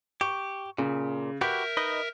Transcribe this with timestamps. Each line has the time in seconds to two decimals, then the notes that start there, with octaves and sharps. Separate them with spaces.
0.21 G4 C#6
0.78 A#2 C#3
1.41 F#4 G4 A#4 B4 E5 G6
1.77 D#4 B4 D#5